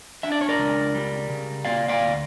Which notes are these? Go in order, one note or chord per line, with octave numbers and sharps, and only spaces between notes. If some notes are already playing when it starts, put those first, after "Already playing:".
D4 E5
D5
C#5
A#4 D5
C#2
G3
C#3
A#3 D5 F5
D5 F5
D2